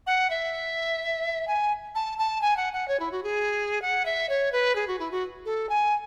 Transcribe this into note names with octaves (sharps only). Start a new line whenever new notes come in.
F#5
E5
G#5
A5
A5
G#5
F#5
F#5
C#5
E4
F#4
G#4
F#5
E5
C#5
B4
G#4
F#4
E4
F#4
A4
G#5